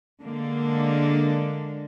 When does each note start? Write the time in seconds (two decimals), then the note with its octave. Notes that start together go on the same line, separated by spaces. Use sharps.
0.23 D3 G#3 A#3 D4